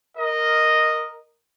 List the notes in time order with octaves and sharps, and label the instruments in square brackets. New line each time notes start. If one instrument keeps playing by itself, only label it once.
[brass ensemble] A#4 D#5